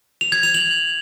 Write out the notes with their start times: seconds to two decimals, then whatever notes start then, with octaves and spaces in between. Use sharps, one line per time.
0.21 F7
0.32 G#6
0.43 F7
0.54 F#7